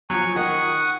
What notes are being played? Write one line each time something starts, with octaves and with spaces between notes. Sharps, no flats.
F3 F#3 G#5 C#6
D#3 F#5 C#6 D#6